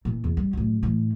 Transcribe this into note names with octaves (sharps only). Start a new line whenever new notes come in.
A#2 E3
E2
G3
F#2 A2
A2 E3